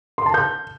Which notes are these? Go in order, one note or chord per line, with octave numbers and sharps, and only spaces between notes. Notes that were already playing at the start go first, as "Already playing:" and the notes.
C6
A5
G6